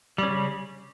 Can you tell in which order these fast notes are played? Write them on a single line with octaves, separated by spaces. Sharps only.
G3 C#4 C#3